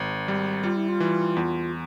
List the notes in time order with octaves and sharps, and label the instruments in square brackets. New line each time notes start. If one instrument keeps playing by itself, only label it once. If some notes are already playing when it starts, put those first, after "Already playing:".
Already playing: [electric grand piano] G#1
G3
[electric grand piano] G3 [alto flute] F4
[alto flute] E4
F4
[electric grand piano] E3
E2